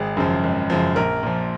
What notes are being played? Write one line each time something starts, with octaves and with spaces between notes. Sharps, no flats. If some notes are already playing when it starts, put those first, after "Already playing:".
Already playing: G#1 G#4
F#2 C#3 F3
G#1
F#2 C#3 F3
A#1 A#4
A#2 F3